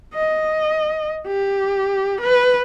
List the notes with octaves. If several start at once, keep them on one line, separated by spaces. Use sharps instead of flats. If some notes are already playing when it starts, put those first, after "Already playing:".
D#5
G4
B4